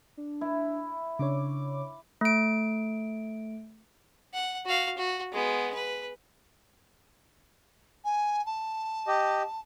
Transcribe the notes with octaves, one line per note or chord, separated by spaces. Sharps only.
D4
E4
C#3 D4 C#5 D6
A3 D7
F#5
F#4 F5
F#4
G#3 B3
B4
G#5
A5
G4 D#5